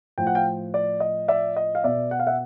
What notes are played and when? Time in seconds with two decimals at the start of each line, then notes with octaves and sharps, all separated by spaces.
0.18 A2 F3 G5
0.27 F#5
0.35 F5 G5
0.74 D5
1.00 D#5
1.28 D5 E5
1.56 D#5
1.75 F5
1.84 B2 D5 E5
2.11 F#5
2.20 F5
2.27 E5 F#5